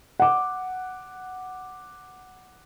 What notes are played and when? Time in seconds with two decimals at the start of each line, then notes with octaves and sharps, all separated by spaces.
0.20 F#5 D6